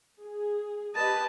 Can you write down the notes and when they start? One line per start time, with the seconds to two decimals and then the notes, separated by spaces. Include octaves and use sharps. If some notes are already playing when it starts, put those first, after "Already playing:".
0.21 G#4
0.95 G4 B4 D#5 A5